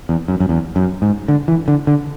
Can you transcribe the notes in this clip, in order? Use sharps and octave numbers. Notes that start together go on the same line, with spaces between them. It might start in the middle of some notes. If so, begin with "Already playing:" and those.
E2
F#2
F#2
E2
F#2
G#2
D3
E3
D3
D3